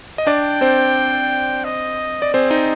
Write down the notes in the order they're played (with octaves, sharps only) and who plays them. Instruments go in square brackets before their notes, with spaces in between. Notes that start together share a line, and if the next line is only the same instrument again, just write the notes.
[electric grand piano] D#5
[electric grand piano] D4 D5 [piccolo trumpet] G5
[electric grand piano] C4 C5
[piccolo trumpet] D#5
[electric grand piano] D5
[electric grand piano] C4 C5 [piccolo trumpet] G#4
[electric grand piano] D#4 D#5